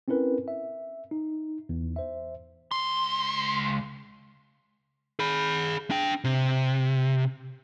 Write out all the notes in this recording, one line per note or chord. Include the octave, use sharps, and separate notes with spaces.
C4 C#4 E4 A#4 B4
E5
D#4
E2
C5 E5
C#2 C6
G#4 B5
D4 G5
C3